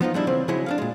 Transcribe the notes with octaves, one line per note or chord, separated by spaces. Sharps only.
F3 B3 D#4 F4
G3 G#3 D4 E4
C#3 E3 F3 C4
C#3 F3 F#3 G#3 E4 G#4
D4 G#4 F5
A#2 G#3